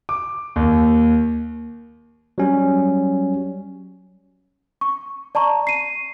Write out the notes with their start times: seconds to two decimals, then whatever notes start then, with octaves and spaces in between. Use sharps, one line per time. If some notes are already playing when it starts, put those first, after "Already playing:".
0.09 D6
0.56 D#2
2.38 F#3 G3 C#4
4.81 C#6
5.35 D5 A5 A#5 C#6
5.67 C7 D#7